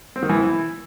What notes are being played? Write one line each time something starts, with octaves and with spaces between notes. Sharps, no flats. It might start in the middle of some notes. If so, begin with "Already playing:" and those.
C4
D#3
E3
E4